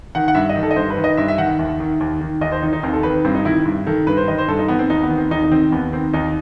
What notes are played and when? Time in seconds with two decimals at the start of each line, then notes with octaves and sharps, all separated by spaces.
0.15 D#3 F#5
0.28 F#5
0.35 G2 E5
0.49 D#5
0.56 D#3
0.63 A4
0.71 D#5
0.76 G2 C5
0.90 B4
0.97 D#3
1.04 D#5
1.17 G2 E5
1.28 E5
1.38 D#3 F#5
1.59 D#2
1.80 D#3
2.00 D#2
2.21 D#3
2.41 D#2 D#5
2.52 C5
2.62 D#3 D#4
2.73 D#4
2.83 D#2 C4
2.93 A4
3.03 D#3 B4
3.24 G2 C4
3.35 D#4
3.45 D#3 E4
3.65 G2
3.87 D#3 A4
4.07 G2 B4
4.17 C5
4.28 D#3 D#5
4.38 C5
4.48 G2 A4
4.59 D#4
4.68 D#3 B3
4.79 C4
4.90 D#2 D#4
5.03 B3
5.10 D#3
5.17 C4
5.31 D#2 D#4
5.43 D#4
5.51 D#3 C4
5.72 D#2 B3
5.93 D#3 C4
6.13 D#2 D#4